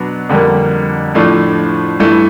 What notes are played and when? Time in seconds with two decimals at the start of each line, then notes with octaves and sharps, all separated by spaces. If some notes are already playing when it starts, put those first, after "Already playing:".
Already playing: B2 F#3 B3 D4
0.29 F2 D3 G3 A#3
1.15 A2 F3 A3 D4
2.00 G2 E3 A3